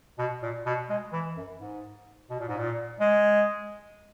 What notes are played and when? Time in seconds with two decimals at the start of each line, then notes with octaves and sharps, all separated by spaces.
0.19 B2
0.42 A#2
0.66 B2
0.89 G#3
1.13 E3
1.37 F#2
1.60 G#2
2.30 B2
2.40 A#2
2.49 G#2
2.58 A#2
3.00 G#3